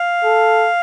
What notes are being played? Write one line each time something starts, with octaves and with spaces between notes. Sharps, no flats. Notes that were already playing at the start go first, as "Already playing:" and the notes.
Already playing: F5
A4